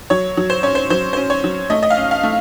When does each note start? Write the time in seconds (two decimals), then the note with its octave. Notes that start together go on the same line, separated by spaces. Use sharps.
0.10 F#3 C#5
0.37 F#3
0.50 C5
0.63 C#4 C#5
0.75 C5
0.90 F#3 C5
1.13 C#4 C5
1.30 C#5
1.44 F#3
1.70 A3 D#5
1.83 D#5
1.90 F5
1.97 C#4
2.11 F5
2.23 A3